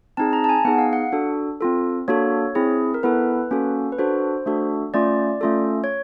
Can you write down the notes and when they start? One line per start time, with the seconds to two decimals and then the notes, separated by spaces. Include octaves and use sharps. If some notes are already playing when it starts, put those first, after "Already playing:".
0.17 C4 D#4 G#4 A5
0.33 A#5
0.44 A5
0.49 G#5
0.65 B3 D#4 G#4 F#5
0.78 F5
0.93 F#5
1.12 D4 F#4 A4
1.61 C4 F4 A4
2.08 A#3 D4 F#4 A4 C#5
2.55 C4 E4 G#4
2.94 A#4
3.03 B3 E4 A4 B4
3.51 A#3 C#4 F#4 A4
3.92 B4
3.98 D4 F#4 A4 C5
4.46 A3 D4 F#4 A4
4.94 A3 C#4 F4 D5
5.41 A3 C#4 F4 A4
5.84 C#5